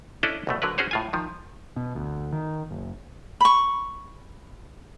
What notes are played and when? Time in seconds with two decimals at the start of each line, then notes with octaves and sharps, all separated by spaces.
0.23 C#4 D4 E4 A4 D5 D#5
0.47 C2 B2 A3
0.62 D3 F#3 A#4 B4
0.78 C#4 F#4 G#4 C5 C#5
0.91 A2 F4 G#5
1.13 D#3 F3
1.76 B2
1.95 D2
2.33 D#3
2.71 F#1
3.41 B5 C#6